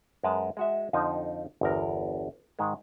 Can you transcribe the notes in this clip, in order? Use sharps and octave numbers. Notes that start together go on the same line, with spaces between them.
F#2 G#3 A#4 B4 A5
G#3 F#4 E5
F2 D3 F3 D#4
G1 E2 A#4
G#2 D#3 G#3